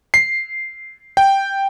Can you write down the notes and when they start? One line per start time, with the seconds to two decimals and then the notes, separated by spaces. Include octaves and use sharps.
0.14 C7
1.17 G5